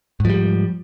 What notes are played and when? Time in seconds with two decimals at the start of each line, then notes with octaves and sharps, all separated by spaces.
0.20 G#2
0.25 F3
0.30 G3